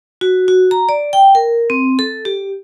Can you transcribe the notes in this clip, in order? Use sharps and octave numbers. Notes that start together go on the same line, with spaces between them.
F#4
F#4
A#5
D5
G5
A#4
C4
A4
G4